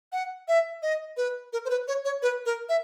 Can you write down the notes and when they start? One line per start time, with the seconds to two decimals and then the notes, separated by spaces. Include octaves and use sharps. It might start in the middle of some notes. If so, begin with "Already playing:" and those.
0.12 F#5
0.48 E5
0.82 D#5
1.17 B4
1.53 A#4
1.65 C5
1.70 B4
1.88 C#5
2.05 C#5
2.22 B4
2.46 A#4
2.69 E5